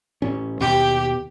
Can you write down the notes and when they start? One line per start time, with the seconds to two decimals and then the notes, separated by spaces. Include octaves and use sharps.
0.22 A1 C#4
0.60 D#2 B2 G4